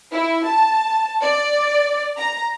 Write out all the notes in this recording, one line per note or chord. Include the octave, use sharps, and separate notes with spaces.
E4
A5
D5
A#5